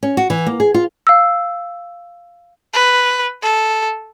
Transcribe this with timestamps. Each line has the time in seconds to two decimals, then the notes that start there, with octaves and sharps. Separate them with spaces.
0.03 C#4
0.17 F#4
0.30 E3
0.46 A#3
0.60 G#4
0.74 F4
1.07 F5 E6
2.74 B4
3.43 A4